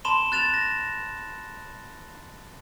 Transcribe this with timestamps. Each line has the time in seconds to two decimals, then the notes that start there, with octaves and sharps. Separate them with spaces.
0.05 A5 B5 C6 E7 G7
0.32 F#6 A6 E7 F7
0.54 A#6